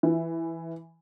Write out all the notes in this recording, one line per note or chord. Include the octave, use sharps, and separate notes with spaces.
E3